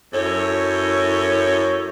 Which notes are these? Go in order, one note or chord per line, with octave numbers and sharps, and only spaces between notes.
F#2 E4 A4 C#5